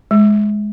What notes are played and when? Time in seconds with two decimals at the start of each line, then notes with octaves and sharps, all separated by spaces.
0.11 G#3